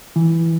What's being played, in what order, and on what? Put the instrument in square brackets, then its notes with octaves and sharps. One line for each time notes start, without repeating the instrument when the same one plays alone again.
[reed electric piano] E3